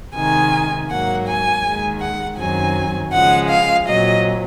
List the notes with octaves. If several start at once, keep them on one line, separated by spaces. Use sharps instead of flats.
C3 D#3 G#3 G#5
G#2 F#3 A#3 F#5
G#5
D#2 D#3 G#3
F#5
F#2 D#3 F#3 C4 G#5
C#3 F3 G#3 F#5
F5
A#2 F#3 C4 D#5